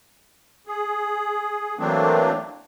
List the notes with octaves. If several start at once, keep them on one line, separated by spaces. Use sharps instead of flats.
G#4
E3 F#3 A3 A#3 C4 D4